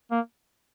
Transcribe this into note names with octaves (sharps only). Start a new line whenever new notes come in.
A#3